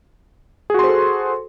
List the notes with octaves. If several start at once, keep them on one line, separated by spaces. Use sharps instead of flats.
F#4 G#4 A4 C5 C6